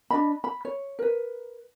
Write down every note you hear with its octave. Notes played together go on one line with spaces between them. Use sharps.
D4 F#4 D#5 B5
B5
C#5
A#4 B4